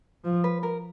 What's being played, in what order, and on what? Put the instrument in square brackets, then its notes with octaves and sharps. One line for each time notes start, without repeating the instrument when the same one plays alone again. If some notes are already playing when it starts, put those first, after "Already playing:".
[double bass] F3
[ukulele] B4
A#4